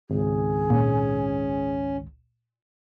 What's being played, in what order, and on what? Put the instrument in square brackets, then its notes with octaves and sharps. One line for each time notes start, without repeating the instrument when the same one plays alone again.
[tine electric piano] G#1 C#2 [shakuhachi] G#4
[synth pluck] A#2 [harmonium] C#4